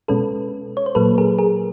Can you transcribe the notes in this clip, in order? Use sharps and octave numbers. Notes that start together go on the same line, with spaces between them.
B2 G#3 C#4 A4 B4
C#5
C5
A#2 F#3 A#3 A4 B4
G#4 A#4
G#4 A#4